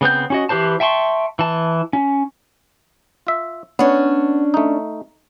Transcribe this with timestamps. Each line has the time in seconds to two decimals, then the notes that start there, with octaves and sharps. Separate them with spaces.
0.01 C#3 B3 C4 G6
0.30 C#4 F#4 D#5
0.49 E3 G4 B4 C5 A5
0.80 E5 G5 A5 C6 C#6
1.39 E3 A5
1.93 C#4
3.27 F4 E5
3.79 B3 C#4 D4
4.54 A3 D#4